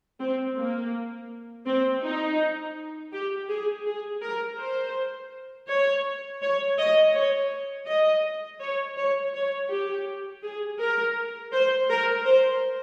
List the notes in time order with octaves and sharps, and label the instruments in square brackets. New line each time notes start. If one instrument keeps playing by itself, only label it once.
[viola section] C4
A#3
C4
D#4
G4
G#4
G#4
A#4
C5
C#5
C#5
D#5
C#5
D#5
C#5
C#5
C#5
G4
G#4
A#4
C5
A#4
C5